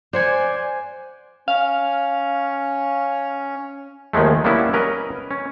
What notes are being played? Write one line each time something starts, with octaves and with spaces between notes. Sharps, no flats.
C5 D5 F#5 G#5
C#4 F5
D#2 D#3 F3 G#3 A3
G3 A#3 B3 C#4 E4
C#4 A#4 B4 D#5
C#4